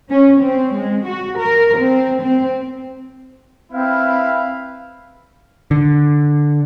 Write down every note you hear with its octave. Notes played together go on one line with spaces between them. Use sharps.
C#4
C4
G#3
F#4
A#4
C4
C4
C4 E4 B4 F5
D3